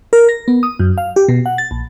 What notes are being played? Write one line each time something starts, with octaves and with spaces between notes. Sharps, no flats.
A#4
A#6
B3
D#6
F#2
F5
G4
B2
F#5
A6
A#1